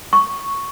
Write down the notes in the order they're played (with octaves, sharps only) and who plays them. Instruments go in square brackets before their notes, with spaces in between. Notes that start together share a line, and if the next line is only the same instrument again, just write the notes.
[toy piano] C#6